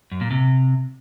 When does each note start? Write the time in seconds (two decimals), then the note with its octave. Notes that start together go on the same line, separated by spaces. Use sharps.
0.12 F#2
0.21 A#2
0.31 C3